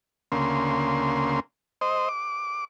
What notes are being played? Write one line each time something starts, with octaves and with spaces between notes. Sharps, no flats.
D2 C#3 A#3 C6
C5 D#5
D6